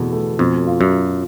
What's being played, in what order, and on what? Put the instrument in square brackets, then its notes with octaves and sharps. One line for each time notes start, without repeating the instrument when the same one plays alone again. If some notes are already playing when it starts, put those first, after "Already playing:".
Already playing: [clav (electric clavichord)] E2 [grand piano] B2 A3
[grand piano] A3
[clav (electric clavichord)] F2 [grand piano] B2
[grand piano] F4
[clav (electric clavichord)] F#2
[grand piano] F4